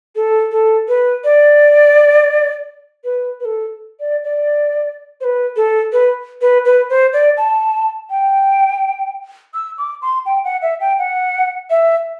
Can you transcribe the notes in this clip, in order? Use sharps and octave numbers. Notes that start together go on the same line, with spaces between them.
A4
A4
B4
D5
B4
B4
A4
D5
D5
C5
B4
A4
B4
B4
B4
C5
D5
A5
G5
E6
D6
C6
G5
F#5
E5
G5
F#5
E5